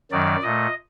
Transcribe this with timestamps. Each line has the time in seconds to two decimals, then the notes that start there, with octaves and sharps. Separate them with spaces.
0.12 F#2 D#3 F#3 D5
0.42 A#2 A3 D#5